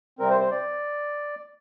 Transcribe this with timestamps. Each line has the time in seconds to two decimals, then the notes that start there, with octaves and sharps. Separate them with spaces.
0.19 C3 G3 C4 A#4
0.30 C5
0.41 C5
0.51 D5